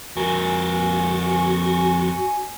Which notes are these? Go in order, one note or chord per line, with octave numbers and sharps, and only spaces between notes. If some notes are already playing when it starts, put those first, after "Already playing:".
F2 F#4 A#4 G#5